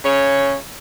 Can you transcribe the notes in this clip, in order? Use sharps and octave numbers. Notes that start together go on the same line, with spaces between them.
C#3 C#5